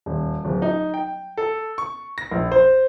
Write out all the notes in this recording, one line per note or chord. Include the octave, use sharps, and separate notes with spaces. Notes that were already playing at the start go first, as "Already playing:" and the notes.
D#1
D1
D#4
G5
A4
C#6
A#6
A#1
C5